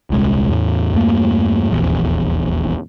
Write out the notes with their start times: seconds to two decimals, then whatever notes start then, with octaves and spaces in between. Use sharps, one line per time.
0.10 D#1 C2 G#3
0.49 E2 A2
0.93 E2 G2 A3 A#3
1.70 D#1 A#1 E2